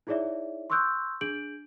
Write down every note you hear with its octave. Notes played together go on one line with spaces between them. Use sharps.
D#4 E4 G#4 C#5 D5 E5
C6 C#6 D#6 E6 F#6 G6
D4 G#4 G6 D7 F#7